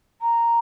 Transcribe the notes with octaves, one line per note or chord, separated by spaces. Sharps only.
A#5